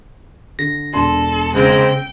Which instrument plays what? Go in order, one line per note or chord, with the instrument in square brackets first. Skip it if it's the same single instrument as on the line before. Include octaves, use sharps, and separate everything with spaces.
[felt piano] D3 [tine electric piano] A#6
[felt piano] E1 D4 C6 [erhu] A4
[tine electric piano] C#3 [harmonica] G#3 C4 [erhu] G5